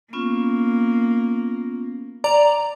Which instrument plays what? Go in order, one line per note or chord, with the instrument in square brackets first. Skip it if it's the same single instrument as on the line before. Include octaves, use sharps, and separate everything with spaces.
[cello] A#3 [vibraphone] B3 C#4 F4
[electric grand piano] D5 [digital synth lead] A#5